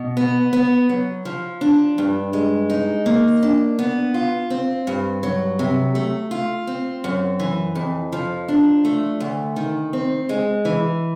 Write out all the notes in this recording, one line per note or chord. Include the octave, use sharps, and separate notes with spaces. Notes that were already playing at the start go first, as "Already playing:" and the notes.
Already playing: B2
B3
B3
F#3
F3
D4
G2
G#3
D#4
A#3
D4
B3
F4
C4
G2
F#3
C3
A3
F4
C4
F#2
E3
F2
F3
D4
A3
D2
D#3
C4
G#3
E3